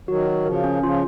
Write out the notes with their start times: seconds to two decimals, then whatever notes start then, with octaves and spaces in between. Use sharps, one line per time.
0.08 D#3 F#3 F#4
0.27 F#4
0.45 C#3 F3 A#4
0.64 C#4
0.83 C#3 F3 F4